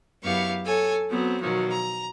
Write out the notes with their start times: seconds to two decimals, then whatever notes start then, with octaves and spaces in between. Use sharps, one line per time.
0.24 F#2 B3 E4 G4 F5 C#6
0.65 A4 C#5 G#5
1.09 F#3 B3 C4
1.40 B2 D#3 F3 F#3
1.72 A#5